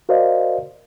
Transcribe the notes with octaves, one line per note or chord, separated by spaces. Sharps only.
F#4 A#4 C5 D5 D#5 F5